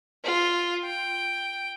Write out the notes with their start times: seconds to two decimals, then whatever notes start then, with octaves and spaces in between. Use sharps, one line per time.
0.24 F4
0.84 G5